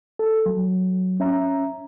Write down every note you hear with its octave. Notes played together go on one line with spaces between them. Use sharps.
A4
F#3
C#4 E5 A#5